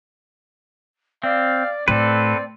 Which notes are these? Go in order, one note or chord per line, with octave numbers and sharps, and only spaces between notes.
C4 D5 F5
A2 C4 A4 B4 D5